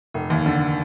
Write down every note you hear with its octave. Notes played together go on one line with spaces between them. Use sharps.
F1
D#2
D3